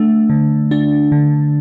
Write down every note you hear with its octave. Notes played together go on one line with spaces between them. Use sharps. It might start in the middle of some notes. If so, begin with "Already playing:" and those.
Already playing: A3 D4
D3
D4
D3